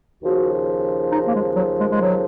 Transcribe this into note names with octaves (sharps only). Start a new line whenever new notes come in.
D#2 C#3 F3 F#4
D#4
A#3
G#3
F#3
G#3
G#3
F#3